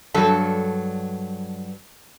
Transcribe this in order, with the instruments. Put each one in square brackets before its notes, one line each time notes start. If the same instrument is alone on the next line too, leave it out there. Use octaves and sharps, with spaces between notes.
[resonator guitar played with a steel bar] G2 F#3 A4